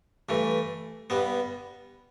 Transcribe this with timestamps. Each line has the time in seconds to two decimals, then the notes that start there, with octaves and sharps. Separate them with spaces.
0.29 G2 E3 A3
1.10 G2 G3 B3